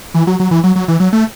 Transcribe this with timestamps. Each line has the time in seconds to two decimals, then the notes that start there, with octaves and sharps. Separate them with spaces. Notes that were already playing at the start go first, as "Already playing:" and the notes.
0.15 E3
0.27 F#3
0.40 F#3
0.51 E3
0.64 F#3
0.76 F#3
0.88 E3
1.00 F#3
1.13 A3